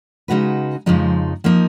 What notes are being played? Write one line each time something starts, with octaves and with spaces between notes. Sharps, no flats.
C#3 G#3 D#4 F#4 B4
F2 C#3 F3 G#3 D#4
F3 A#3 D#4